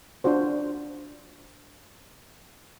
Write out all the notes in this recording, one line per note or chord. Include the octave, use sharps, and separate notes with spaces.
D4 F4 F#4 C5